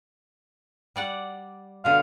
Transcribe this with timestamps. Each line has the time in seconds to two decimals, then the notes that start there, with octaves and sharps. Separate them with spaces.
0.96 G3 D5 F#5
1.85 B2 D3 F5